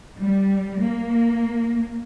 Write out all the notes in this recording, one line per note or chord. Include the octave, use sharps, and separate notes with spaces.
G3
A#3